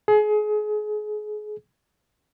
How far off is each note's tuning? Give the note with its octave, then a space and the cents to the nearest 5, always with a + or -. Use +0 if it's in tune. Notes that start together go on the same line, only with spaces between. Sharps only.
G#4 +30